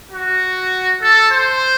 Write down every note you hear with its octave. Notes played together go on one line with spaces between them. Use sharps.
F#4
A4
C5